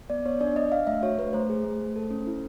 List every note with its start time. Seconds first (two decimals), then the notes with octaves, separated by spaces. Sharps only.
0.10 B3 D5
0.25 B3 C#5
0.41 D4 D5
0.56 D4 D#5
0.72 D4 F5
0.87 A3 E5
1.03 F#4 C#5
1.18 A3 B4
1.33 A3 C5
1.49 G#4
1.64 A3
1.80 A3
1.96 A4
2.11 C#4
2.27 E4